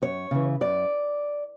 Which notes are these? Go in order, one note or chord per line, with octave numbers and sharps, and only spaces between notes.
F#2 C#5
C#3 E3
F#2 D5